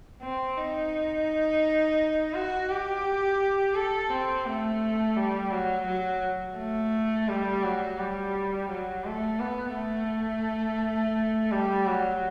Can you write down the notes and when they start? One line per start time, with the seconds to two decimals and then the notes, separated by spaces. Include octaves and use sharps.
0.22 C4
0.57 D#4
2.33 F#4
2.69 G4
3.75 A4
4.10 C4
4.46 A3
5.16 G3
5.51 F#3
5.87 F#3
6.57 A3
7.28 G3
7.63 F#3
7.99 G3
8.69 F#3
9.05 A3
9.40 B3
9.75 A3
11.51 G3
11.87 F#3